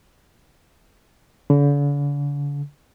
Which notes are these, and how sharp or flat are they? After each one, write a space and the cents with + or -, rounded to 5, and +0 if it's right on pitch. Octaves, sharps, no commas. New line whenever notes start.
D3 -45